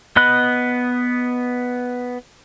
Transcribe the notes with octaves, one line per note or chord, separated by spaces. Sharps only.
B3 D#5 B5 F#6